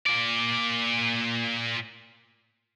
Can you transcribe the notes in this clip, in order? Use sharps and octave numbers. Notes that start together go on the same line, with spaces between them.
A#2 D5